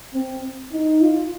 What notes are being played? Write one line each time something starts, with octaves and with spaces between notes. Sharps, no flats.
C4
D#4
F4